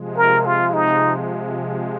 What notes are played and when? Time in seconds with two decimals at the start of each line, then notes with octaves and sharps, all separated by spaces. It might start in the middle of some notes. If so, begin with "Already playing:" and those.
Already playing: C3 F3 G#3
0.17 A#4
0.46 F4
0.74 D#4